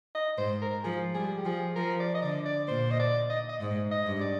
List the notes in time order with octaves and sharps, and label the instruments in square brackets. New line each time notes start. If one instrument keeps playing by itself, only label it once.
[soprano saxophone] D#5
[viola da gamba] G#2 [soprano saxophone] C5
[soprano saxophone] A#4
[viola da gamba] F3 [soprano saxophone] G#4
[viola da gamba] G3 [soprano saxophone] G#4
[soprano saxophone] G4
[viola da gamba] F3 [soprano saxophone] G#4
[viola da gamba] F3 [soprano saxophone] A#4
[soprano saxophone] D5
D#5
[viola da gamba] D3 [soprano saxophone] D5
[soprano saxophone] D5
[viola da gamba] A#2 [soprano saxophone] C5
[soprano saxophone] D#5
D5
D#5
D#5
[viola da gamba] G#2
[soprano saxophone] D#5
[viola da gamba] G2
[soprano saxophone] D5